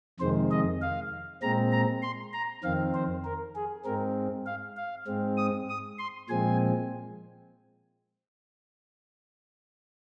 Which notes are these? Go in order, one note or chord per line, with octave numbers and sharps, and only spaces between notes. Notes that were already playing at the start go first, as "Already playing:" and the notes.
F2 C3 D#3 G#3 C5
D#5
F5
A#2 G#3 C4 A#5
A#5
C6
A#5
F2 D#3 C4 F5
C5
A#4
G#4
G#2 G#3 C4 A#4
F5
F5
G#2 G#3 C4
D#6
D#6
C6
A#2 F3 G#3 C4 G#5